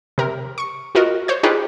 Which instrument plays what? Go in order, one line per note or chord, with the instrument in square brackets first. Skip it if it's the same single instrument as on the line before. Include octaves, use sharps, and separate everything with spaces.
[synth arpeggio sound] C3 A#4
C#6 C#7
F4 F#4 A#4 D#5
C5 C#5 G6
D#4 F4 G4 G#4 B4 C#5